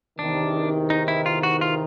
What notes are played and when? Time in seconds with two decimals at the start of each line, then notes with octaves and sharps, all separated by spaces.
0.18 E2 C3 D#3 D4
0.90 D#4
1.08 E4
1.26 F4
1.43 F#4
1.61 F4